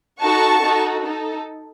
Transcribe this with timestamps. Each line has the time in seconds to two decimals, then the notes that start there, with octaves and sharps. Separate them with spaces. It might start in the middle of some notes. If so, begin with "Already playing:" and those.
0.22 D#4 F#4 A4 A5 C#6
0.62 D#4 F#4 A4
1.04 D#4 A4